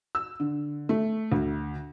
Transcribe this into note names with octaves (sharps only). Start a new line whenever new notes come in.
E6
D3
A3
D2